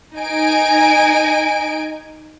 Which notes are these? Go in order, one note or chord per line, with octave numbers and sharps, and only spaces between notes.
D#4 G#5 D7